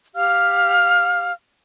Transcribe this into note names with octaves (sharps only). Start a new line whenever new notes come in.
G4 F5 F6